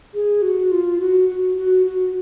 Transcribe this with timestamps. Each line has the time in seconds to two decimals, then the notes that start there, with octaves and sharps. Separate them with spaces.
0.14 G#4
0.42 F#4
0.72 F4
1.00 F#4
1.29 F#4
1.58 F#4
1.86 F#4